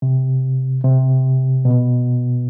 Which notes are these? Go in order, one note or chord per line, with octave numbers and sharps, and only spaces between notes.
C3
C3
B2